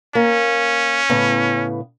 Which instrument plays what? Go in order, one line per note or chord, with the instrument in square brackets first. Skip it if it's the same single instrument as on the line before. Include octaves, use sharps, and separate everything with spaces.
[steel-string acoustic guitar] A#3 [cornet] C#4
[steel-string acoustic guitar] A2 C#3 B3